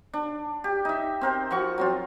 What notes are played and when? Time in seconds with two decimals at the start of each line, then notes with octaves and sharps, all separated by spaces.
0.14 D4
0.64 G4
0.85 D#4 E5
1.21 C4 A#4 C5
1.51 F3 F#4 C#6
1.78 F#3 C4 F4